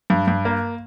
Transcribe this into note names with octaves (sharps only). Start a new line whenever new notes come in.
G2
G2
A#3